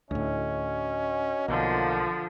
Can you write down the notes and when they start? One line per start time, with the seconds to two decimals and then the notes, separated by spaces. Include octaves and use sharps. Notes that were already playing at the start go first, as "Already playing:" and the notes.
0.11 D2 A2 C#4 D4 F#4 D#5
1.48 B1 D3 F3 A#3